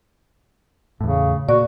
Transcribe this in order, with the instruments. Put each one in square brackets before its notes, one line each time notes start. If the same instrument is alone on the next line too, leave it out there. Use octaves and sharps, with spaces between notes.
[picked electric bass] E2 A2 [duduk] C#3
[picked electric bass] A#2 [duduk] F#4 [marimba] D5